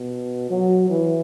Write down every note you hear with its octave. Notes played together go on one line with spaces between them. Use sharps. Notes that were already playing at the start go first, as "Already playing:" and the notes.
Already playing: B2
F#3
E3